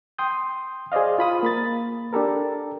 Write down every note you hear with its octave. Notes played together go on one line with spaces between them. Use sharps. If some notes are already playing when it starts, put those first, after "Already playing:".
G5 C6 D#6 G6
G#4 C5 D5 D#5 F5
F4 B5 D#6
A#3 B5 A6
D4 G4 A4 A#4